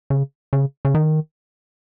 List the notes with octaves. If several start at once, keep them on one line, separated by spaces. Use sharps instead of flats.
C#3
C#3
C#3
D#3